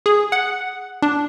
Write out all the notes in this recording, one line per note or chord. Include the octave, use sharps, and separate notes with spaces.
G#4
F#5
D4